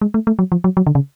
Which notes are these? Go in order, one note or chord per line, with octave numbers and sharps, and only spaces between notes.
G#3
A3
A3
F#3
F3
F#3
F#3
D3
C#3